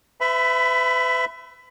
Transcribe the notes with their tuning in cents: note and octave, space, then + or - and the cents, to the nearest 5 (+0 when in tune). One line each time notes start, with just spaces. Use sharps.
B4 +40 E5 +10 B5 +5